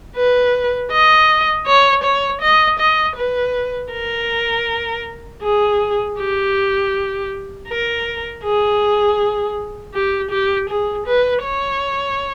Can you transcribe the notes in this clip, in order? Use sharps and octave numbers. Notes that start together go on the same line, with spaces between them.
B4
D#5
C#5
C#5
D#5
D#5
B4
A#4
G#4
G4
A#4
G#4
G4
G4
G#4
B4
C#5